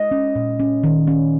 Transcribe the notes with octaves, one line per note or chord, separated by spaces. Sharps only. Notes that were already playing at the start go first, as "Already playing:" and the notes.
Already playing: G#3 D#5
C#4
A#2
C#4
D#3
C#4